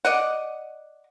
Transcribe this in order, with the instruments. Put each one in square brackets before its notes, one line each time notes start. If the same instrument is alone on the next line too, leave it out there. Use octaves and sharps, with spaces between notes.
[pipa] D5 D#5 F#5